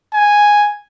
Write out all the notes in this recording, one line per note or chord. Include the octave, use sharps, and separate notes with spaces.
G#5